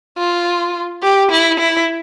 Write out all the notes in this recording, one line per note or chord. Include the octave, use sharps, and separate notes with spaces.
F4
G4
E4
E4